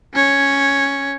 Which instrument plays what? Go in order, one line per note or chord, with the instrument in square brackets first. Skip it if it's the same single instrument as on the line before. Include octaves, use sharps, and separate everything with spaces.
[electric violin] C#4 C#5